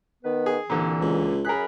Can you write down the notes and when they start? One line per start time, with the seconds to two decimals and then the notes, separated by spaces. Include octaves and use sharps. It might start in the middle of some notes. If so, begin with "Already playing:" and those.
0.24 D#3 B3 B4
0.46 G#4
0.70 C2 A#2 D3 E3
1.01 C#2
1.45 F#2 G#4 A#4 B5 F#6